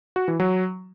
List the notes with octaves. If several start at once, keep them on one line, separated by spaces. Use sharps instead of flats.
F#4
E3
F#3